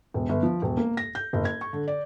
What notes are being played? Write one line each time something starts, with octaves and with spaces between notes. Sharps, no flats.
E1
G1
F3
E1
A#3
A#6
G6
F#1
G#6
C#6
D3
D5